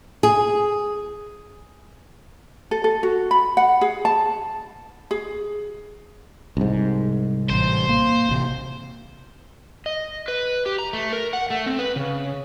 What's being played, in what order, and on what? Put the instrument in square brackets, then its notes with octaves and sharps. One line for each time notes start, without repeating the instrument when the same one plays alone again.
[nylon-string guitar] G#4
[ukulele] A4
A4
F#4
B5
F#5
G#4
A5
G#4
[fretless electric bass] C2 G#2
[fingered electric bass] A1 [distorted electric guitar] C5
[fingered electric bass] A#3
A1 C3
[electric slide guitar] D#5
B4
G4
A#5
A3
A#4
F#5
A3
C4
B4
C#3